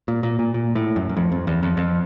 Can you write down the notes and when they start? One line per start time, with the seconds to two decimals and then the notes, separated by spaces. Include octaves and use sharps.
0.08 A#2
0.23 A#2
0.39 A#2
0.54 A#2
0.75 A2
0.96 F#2
1.09 F#2
1.17 F2
1.32 F2
1.47 E2
1.63 F2
1.77 F2